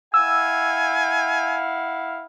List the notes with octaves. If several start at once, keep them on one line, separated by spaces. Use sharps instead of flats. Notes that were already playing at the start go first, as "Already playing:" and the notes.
E4 F5 F#5 G#5 E6